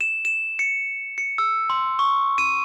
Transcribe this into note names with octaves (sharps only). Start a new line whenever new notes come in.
E7
E7
C#7
C#7
E6
C6
C#6
D#7